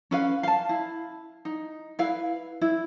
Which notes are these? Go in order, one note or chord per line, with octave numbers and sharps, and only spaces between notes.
C#4 B4 F5
F5 A5
E4
D#4
E4 B4 F5
E4